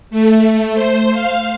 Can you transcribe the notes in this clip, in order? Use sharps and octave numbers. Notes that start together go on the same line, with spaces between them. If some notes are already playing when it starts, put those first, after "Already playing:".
A3
C5
F5